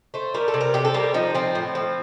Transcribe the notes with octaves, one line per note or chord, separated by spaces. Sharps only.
A3 C5
G3 A#4
A4
C3
A#4
C3 G4
A4
G3 A#3
F3 D#4
F3 C4
A2
F3